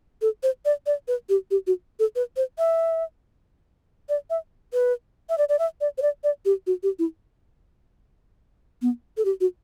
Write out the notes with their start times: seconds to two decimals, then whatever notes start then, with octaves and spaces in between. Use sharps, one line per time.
0.22 A4
0.43 C5
0.65 D5
0.86 D5
1.08 B4
1.29 G4
1.51 G4
1.67 F#4
1.99 A4
2.16 B4
2.37 C5
2.58 E5
4.09 D5
4.30 E5
4.73 B4
5.29 E5
5.38 D5
5.49 D5
5.59 E5
5.81 D5
5.98 C5
6.02 D5
6.24 D5
6.45 G4
6.67 F#4
6.83 G4
6.99 E4
8.82 B3
9.17 A4
9.25 G4
9.41 F#4